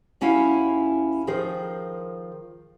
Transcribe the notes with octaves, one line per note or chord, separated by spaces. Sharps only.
D#2 C#4 E4 F#4 F5 G#5
D#3 F3 G#4 A#4 C5